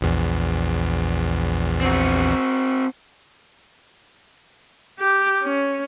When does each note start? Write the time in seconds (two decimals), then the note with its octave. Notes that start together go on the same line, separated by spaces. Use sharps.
0.01 A#1 E2
1.81 C4 F#4
4.99 G4
5.43 C#4